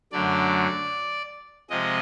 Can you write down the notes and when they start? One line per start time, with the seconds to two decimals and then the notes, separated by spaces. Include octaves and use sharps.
0.12 F#2 D3 F#3 A3 D5
1.70 C3 F3 G#3 D#5